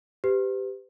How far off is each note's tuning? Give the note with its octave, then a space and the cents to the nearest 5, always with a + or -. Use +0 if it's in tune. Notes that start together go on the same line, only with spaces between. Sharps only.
G4 +0 B4 +40